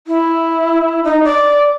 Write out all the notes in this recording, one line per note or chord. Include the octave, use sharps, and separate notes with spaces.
E4
D#4
D5